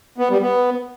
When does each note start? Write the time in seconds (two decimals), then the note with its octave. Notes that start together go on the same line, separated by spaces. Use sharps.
0.18 B3
0.30 G3
0.42 B3